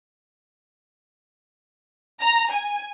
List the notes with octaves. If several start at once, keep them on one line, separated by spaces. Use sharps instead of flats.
A#5
G#5